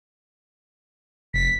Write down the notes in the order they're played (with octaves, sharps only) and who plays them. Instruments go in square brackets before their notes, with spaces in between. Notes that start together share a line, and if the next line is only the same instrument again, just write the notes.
[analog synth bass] F1 [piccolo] B6